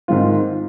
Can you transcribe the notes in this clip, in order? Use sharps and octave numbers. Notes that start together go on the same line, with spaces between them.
G#2 D#3 G#3 C4 F4